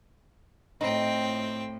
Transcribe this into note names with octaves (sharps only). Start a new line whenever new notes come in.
A2 C4 D#4 G5